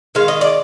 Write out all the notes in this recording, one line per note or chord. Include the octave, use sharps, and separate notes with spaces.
D#3 G#3 F5
D#5
D5